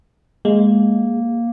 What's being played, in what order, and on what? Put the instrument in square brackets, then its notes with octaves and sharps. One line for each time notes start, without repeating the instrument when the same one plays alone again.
[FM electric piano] G#3 [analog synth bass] A#3